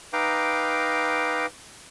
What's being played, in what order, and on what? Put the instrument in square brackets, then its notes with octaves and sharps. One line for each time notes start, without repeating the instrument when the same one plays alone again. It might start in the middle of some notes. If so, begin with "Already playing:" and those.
[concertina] D#4 B4 F5 G5 A#5 D6